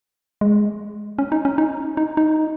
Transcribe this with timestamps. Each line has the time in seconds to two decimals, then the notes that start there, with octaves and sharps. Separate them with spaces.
0.41 G#3
1.19 C#4
1.32 D#4
1.45 C#4
1.58 D#4
1.97 D#4
2.17 D#4